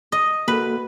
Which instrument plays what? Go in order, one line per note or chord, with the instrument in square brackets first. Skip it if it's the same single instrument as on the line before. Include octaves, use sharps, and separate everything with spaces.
[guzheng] D#5
[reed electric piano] A#3 F#4 A4 [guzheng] B4